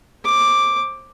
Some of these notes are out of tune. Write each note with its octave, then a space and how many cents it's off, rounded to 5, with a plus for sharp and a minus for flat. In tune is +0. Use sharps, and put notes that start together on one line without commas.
C5 +30 D6 +0